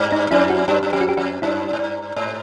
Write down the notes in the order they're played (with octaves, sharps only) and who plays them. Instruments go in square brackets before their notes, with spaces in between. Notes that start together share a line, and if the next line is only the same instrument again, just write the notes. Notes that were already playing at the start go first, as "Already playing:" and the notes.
Already playing: [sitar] G2
[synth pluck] D#4
[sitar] F2 [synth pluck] E4
[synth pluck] F#4
[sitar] F#2 [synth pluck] G4
[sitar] F#2
[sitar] F2 [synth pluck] G4
[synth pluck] F#4
G4
[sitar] F2 [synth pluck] F#4
[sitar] F#2 [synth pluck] E4
[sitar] G#2
G2
G#2